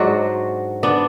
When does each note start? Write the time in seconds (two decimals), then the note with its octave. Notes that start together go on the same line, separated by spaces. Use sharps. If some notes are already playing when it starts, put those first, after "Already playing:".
Already playing: G#2 F#3 D4 F#4
0.83 B3 D4